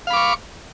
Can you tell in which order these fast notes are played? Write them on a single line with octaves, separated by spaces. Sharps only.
F5 B5 D6 C#6